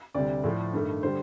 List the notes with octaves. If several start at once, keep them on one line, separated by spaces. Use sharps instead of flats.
D2 C3 G3 D5
A2 F3 A3
G2 D#3 A3
D3 G3 C5